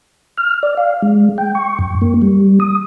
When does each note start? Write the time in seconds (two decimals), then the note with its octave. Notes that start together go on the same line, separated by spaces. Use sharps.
0.37 F6
0.63 D5
0.77 F5
1.02 G#3
1.38 G5
1.55 C#6
1.79 F#2
2.01 A#3
2.22 G3
2.60 D#6